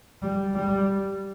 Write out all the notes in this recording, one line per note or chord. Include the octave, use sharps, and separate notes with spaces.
G3
G3